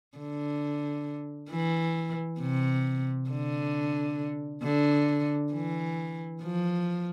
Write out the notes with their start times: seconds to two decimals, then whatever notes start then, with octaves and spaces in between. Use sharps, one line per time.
0.18 D3
1.51 E3
2.40 C3
3.30 D3
4.63 D3
5.53 E3
6.42 F3